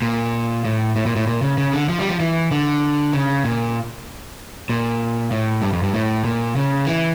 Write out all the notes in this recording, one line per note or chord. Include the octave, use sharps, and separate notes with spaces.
A#2
A2
A2
A#2
A2
A#2
C#3
C#3
D3
F3
G3
F3
E3
D3
C#3
A#2
A#2
A2
G2
F2
G2
A2
A#2
C#3
E3